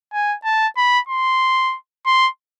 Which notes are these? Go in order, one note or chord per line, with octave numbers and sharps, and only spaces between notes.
G#5
A5
B5
C6
C6